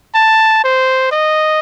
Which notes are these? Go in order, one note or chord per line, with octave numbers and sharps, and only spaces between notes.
A5
C5
D#5